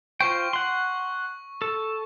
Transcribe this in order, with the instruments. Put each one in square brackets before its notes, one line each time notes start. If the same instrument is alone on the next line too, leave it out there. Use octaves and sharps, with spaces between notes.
[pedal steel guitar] F4 C5 G5 [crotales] C#6
[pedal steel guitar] F#5 C6
A4